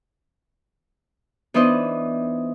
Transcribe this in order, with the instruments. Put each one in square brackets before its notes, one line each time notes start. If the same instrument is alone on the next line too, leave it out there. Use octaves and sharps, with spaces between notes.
[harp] E3 B3 D4 D#4 C5 D#5